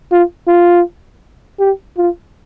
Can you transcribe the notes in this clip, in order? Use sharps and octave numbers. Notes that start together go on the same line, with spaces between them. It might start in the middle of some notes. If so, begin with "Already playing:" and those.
F4
F4
G4
F4